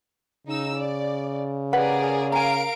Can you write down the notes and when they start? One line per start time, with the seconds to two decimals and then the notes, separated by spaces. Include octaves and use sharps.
0.47 C#3 D#4 E6
0.77 D5
1.73 G4 G#4 A#4 B4 D5 F#5
2.32 A#4 F5 G#5 A#5 D7